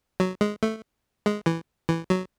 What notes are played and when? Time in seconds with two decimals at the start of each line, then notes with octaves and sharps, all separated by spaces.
0.20 F#3
0.41 G#3
0.63 A3
1.26 G#3
1.46 E3
1.89 E3
2.10 F#3